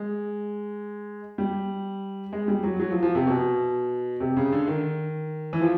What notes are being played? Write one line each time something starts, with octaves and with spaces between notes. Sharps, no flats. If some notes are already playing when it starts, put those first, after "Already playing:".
Already playing: G#3
G3
G#3
G3
F#3
F#3
F3
F3
C3
B2
C3
C#3
D3
D#3
E3
F3